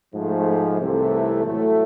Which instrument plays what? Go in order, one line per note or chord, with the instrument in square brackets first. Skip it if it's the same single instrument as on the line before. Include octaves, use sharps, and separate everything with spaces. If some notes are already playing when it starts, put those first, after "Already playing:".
[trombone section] G#2 F3 A3
C2 C3 E3 A3
A2 F#3 A3